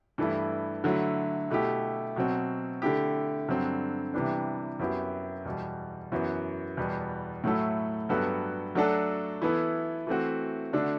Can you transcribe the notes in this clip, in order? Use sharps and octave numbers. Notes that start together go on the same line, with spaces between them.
G2 E3 A3 E4
D3 F#3 A3 E4
B2 A3 E4 G4
B2 F#3 C4
D3 A3 E4 G4
G2 D3 F#3 C4
C3 E3 G3 B3 D4
F#2 F#3 B3 E4 G4
E2 B2 G3
F#2 E3 B3 F#4
E2 B2 G3 B3
A2 F#3 A3 E4 A4
G2 F#3 B3 F#4 A4
F#3 A3 D4 F#4 A4
E3 B3 E4 A4
E3 A3 C4 F#4
D3 A3 D4 F#4 A4